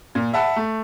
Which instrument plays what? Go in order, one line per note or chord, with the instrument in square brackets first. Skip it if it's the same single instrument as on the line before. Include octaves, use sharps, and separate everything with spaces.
[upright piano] A#2
E5 F#5 A5 B5
A3